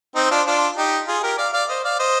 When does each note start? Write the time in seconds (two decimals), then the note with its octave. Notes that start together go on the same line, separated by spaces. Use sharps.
0.15 C4 D#4
0.31 D4 F4
0.47 D4 F4
0.77 D#4 G4
1.07 F4 G#4
1.23 G4 A#4
1.38 D5 F5
1.53 D5 F5
1.69 C5 D#5
1.84 D5 F5
1.99 C5 D#5